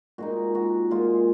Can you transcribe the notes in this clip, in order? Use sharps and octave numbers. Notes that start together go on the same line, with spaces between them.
A#2 G#3 D#4 F#4
F#4
A#2 G#3 D#4 F4